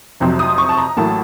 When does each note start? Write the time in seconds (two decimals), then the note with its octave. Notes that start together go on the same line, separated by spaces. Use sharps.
0.20 F1 F2 C3 F#3 C4
0.39 D#6
0.58 C#6
0.69 A5
0.77 A#5
0.97 A1 A2 F#3 A#3 A5